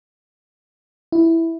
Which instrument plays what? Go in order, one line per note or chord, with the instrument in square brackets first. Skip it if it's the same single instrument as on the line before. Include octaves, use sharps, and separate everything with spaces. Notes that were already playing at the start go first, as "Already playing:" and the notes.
[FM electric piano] E4